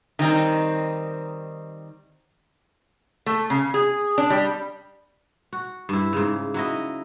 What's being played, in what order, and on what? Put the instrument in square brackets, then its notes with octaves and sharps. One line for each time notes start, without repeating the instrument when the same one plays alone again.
[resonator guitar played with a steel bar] D#3 G3 C4 D#4
A3
C#3
G#4
D4
G3
[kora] F#4
G2 E4
G#2 C#3
F#3 E4 D#5